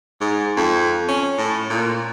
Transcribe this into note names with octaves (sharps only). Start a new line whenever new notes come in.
G#2
F2
C#4
A2
A#2